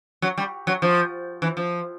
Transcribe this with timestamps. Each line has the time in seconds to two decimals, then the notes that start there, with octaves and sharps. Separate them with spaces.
0.22 F#3
0.38 G3
0.67 F#3
0.82 F3
1.42 E3
1.57 F3